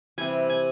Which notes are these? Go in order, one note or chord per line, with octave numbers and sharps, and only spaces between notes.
C3 E3 G3 G#5
G#5